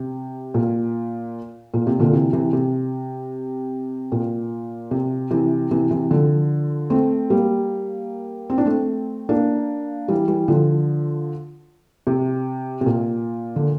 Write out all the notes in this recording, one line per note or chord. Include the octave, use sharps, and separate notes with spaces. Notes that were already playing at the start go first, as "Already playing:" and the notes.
Already playing: C3
A#2
A#2
C3
A#2 D3
C3 E3
C3 E3
C3
A#2
C3
C3 E3
C3 E3
C3 E3
D3 F3
A3 C4
G3 A#3
C4
D4
A3 C4
A#3 D4
E3 G3
E3 G3
D3 F3
C3
C3
A#2
D3